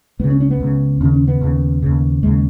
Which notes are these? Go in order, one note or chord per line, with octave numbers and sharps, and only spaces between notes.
C#2 C#3 B3
C#4
C#4
B3
C#2 C#3
D#2 C#3 C#4
C#4
B3
D#2 C#3
D#2 C#3
D#2 C#3 G#3